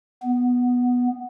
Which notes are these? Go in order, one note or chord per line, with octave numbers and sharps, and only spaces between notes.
B3